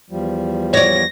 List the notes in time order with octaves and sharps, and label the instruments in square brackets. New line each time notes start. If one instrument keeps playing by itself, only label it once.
[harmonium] E2 F3 G3
[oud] C#5 D5 [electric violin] A#6